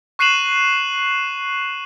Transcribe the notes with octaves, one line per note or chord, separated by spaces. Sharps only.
C#6 F#6 C7 D#7 E7 F#7